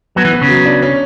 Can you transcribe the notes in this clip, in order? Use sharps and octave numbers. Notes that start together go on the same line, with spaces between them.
F#3 B3
E3
B3
C#3
F#3
D4
C#4